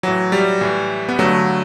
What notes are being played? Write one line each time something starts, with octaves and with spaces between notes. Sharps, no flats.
A2 E3 F#3
G3
A2 E3
B3
G2 D3 F#3 A3